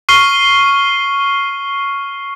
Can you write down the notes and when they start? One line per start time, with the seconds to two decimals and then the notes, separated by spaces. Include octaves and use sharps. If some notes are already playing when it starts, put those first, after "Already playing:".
0.09 C#6 F6 C7 D#7 G7